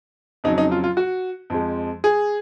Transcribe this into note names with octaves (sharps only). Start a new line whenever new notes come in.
F2 C#3 F#3 D#4
D#4
F4
F4
F#4
F2 F3 G#3
G#4